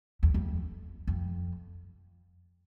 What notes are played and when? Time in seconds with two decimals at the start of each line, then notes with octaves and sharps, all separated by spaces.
0.23 E2
0.34 F2
1.07 F2